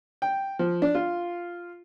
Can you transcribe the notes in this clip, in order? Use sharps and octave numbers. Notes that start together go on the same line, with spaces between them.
G5
F3
D4
F4